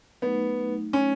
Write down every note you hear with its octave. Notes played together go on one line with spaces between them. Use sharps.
F#3 A3 B3 D#4
C#4